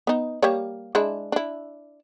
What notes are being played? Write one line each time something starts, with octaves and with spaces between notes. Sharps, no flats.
B3 D#4
G3 A#3 C#5
G#3 D4 E4
D4 E4